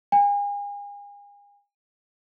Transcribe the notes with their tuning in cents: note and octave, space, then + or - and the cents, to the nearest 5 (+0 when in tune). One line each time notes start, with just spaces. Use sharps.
G#5 -40